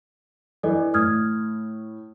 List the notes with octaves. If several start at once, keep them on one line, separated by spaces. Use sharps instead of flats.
E3 A4 D5 D#5
A2 D#6 F6 G#6